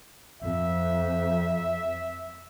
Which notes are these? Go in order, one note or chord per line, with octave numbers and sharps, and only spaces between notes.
F2 E5